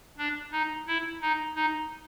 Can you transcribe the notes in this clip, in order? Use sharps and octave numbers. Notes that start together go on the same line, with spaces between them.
D4
D#4
E4
D#4
D#4